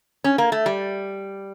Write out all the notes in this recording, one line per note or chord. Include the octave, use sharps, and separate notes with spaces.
C#4
A#3
A3
G3